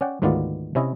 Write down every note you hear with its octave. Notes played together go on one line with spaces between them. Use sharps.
C#4 D5 F#5 G5
D2 G#2 D#3 B3 F4 D5
C3 C#4 E4 C#5 D#5